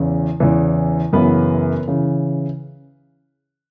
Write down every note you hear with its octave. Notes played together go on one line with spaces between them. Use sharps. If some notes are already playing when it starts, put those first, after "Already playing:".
Already playing: E2 C#3 E3
E2 C#3 E3
F#2 C#3 E3 B3 B4
C#3 E3